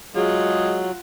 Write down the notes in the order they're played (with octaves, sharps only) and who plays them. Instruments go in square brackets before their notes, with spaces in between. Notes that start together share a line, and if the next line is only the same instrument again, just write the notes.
[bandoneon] F#3 [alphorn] G#3 [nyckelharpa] F4 F#5 [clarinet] G#4